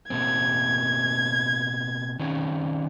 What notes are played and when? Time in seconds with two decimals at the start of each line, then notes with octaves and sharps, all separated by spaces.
0.10 B2 A#3 C4 G#6
2.19 D#3 C4 C#4